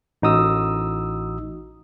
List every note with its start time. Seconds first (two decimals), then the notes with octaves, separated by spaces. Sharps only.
0.22 A1 D#4 F#4 D#6 E6